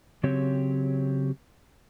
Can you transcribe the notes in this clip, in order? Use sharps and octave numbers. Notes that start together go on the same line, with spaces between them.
C#3 F#3 C4 G4 C#5